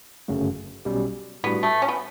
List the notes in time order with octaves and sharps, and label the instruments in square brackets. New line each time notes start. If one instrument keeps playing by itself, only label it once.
[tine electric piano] G1 F#2 C#3 F#3 A3
B1 B2 G3 C#4 G4
[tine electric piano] A2 G3 D4 F#4 [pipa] B3
[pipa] A3
C#4
B3